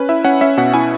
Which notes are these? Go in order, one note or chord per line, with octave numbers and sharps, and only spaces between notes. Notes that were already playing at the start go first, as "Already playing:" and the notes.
Already playing: C#4 B4
E4 E5
C#4 F#5
C#4 E5
B2 F#5
E4 G#5